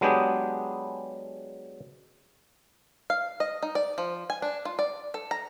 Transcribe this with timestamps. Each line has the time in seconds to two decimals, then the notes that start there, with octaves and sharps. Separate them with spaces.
0.01 F#3 G#3 B3 D4 G4 G#4
3.10 F5
3.40 D#5
3.63 D#4
3.75 D5
3.98 F3
4.30 G#5
4.42 D4
4.65 F4
4.79 D5
5.14 A4
5.31 A#5